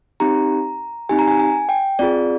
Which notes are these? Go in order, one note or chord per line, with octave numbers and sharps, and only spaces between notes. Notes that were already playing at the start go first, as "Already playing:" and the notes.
C4 D#4 G4 A#5
C4 D#4 G4 G#5
A#5
G#5
G#5
G5
C4 F4 G#4 D5